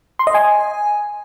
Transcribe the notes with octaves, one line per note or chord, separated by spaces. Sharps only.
C6
D#5
G#5